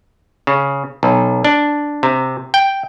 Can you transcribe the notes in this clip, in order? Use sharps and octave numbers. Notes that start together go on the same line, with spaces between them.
C#3
B1
D4
C3
G5